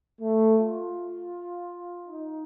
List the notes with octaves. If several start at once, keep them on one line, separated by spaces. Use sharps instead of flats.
A3
F4
D#4